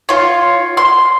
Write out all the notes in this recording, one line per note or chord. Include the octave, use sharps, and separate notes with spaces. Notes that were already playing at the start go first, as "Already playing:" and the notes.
F4 C#5
C6